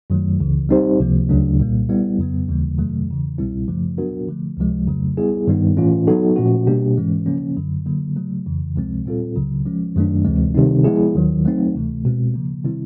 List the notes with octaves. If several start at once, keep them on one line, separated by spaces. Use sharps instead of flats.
F#2 D#3 F#3 A3
C#2 C#3 E3
G3 C4 D#4 G4 C5
C#2 C3 F3 A#3
D2 C#3 F#3 A3 D4
C2 A#2 G3 A#3
G3 B3 E4
F2 C#3 F#3 B3
D#2 C#3 E3 G3 A#3
F2 C3 D#3 F#3 A3
E2 C#3 E3
C2 B2 G3 C4 E4
F#2 C#3 F3 A3
F#3 B3 D4 F#4 A#4
D3 F3 A3
C#2 C3 F3 G#3
F2 C#3 F#3 A3
G3 B3 E4 G#4
G2 D#3 G3 B3 D#4
A2 E3 A3 C#4 F4
F#3 B3 D#4 F#4 A4
A#2 F3 A3 C#4 F#4
B2 G3 A#3 D4 G4
G#2 E3 G#3 C#4
C#3 F3 A#3 C#4
F#2 D3 F#3
D3 F#3 A#3
C#3 F#3 A3
F2 C#3 E3
C#2 C3 F3 G#3 C4
A#2 G3 C4 F4 A4
C#2 C#3 F#3
F3 G#3 C#4
F#2 D#3 F#3 A3 D4
D2 C3 E3 G#3 C4
C3 D#3 G3 C4 D#4
F3 G#3 B3 E4 G#4
D#2 D#3 F#3
F#3 A3 C4 D#4
D2 C3 E3 A3
B2 G#3 C4
C#3 F3 A#3
C3 D#3 G3 C4 E4